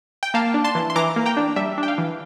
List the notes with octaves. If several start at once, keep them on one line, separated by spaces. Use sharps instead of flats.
G5
A#3 F5 A5
D4
A5 C6
E3
C6
E3 A#5 D6
A#3
G5 A#5
D4
G3 E5
D4
G5
F5
E3